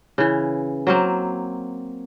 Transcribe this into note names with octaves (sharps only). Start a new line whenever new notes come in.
C#3 E3
F#3 A#3 C4